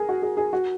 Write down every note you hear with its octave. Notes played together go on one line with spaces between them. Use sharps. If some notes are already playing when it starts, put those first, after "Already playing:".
Already playing: G#4 A#4
F#4
G#4
G#4
F#4